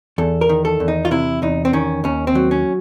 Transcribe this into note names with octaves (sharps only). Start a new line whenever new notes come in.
E2 A4
A#4
D#3
A4
E2
D#4
F4
C3 E4
E2 D#4
C4
D#3 C#4
D#2 C#4
C4
F#3
C#4